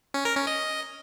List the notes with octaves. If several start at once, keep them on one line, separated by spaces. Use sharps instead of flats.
C#4
A#4
C#4
D#5